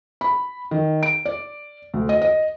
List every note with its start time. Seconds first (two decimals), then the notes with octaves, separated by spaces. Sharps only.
0.21 B5
0.71 D#3
1.03 D7
1.25 D5
1.94 D2
2.09 D#5
2.22 D#5